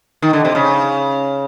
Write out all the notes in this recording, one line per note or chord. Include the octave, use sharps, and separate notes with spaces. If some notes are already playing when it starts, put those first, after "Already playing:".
D#3
D3
C3
C#3